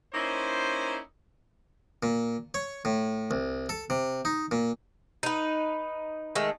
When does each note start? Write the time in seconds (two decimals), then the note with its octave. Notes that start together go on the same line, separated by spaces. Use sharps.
0.12 A#3 C#4 D#4 E4 C5
2.03 A#2
2.54 C#5
2.85 A2
3.31 C2
3.69 A4
3.90 C3
4.25 D#4
4.51 A#2
5.23 D#4 B4
6.35 D#3 G#3 A3